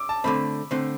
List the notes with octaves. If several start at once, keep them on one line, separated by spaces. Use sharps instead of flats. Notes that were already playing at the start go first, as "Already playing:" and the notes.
Already playing: D6 E6
A5
D3 A3 C4 B5
D3 A3 C4